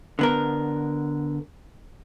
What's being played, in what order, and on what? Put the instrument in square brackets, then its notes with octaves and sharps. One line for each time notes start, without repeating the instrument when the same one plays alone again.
[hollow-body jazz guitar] D3 B3 A#4